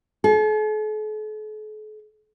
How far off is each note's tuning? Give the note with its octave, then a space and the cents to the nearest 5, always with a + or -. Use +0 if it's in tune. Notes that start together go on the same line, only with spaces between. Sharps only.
A4 -45